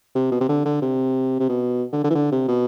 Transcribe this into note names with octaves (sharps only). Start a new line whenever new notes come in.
C3
B2
C3
D3
D3
C3
C3
B2
D3
D3
E3
D3
C3
B2